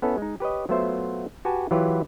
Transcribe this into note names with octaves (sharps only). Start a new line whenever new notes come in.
B3 C#4 E4 A4 B4
G#3 D#4
G4 B4 C#5 D#5
F#3 A3 B3 F4 C5 E5
F#4 G4 B4 F#5 G#5 A5
E3 F#3 F4 G4 B4